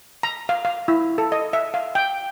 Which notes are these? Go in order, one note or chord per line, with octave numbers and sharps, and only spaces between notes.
A#5
F5
F5
E4
A4
D#5
E5
F5
G5